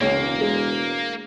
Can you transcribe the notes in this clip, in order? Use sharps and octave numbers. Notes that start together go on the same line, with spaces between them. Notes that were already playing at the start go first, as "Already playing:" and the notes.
E1 C#2 A#3 C#4
G#3